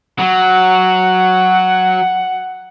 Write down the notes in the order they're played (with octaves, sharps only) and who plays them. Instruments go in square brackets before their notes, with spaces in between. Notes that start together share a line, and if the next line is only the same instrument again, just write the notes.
[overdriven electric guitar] F#3 [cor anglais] F#5